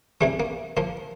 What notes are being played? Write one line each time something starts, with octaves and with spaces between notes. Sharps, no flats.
C3 E3 G3 A3
A#3
A#2 F3 A#3